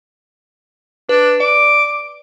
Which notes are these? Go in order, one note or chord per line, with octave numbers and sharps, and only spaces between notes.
D4 B4
D5 D6